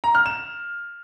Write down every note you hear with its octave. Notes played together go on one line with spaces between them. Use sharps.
A#5
F6
E7